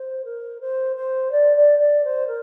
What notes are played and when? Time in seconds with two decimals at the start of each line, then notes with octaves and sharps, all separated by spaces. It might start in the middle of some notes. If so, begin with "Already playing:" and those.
Already playing: C5
0.24 A#4
0.60 C5
0.96 C5
1.31 D5
1.56 D5
1.79 D5
2.04 C5
2.27 A#4